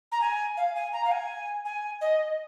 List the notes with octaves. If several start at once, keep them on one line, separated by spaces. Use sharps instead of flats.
A#5
G#5
F5
G#5
A#5
F5
G#5
G#5
D#5